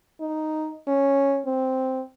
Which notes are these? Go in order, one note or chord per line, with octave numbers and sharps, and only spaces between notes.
D#4
C#4
C4